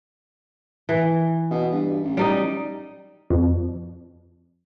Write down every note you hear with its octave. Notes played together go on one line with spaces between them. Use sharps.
E3
B2
G2
A1
G3 D#4 D#5
F2